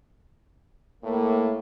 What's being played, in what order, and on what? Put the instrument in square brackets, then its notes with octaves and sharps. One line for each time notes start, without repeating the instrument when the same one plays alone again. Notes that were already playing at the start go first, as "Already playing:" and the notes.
[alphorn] A2 [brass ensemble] A#3